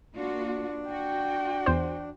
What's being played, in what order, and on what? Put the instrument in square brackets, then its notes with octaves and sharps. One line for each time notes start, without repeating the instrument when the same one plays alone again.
[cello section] A#3 F4 F#4 [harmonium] D4
[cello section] F#4 [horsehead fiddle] G5
[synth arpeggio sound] E2 C5